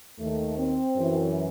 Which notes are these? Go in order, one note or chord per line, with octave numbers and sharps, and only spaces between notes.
D#2 D#3 A3
C4
F#2 E3